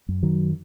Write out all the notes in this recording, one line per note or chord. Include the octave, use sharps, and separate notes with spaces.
F#2
D#3 F#3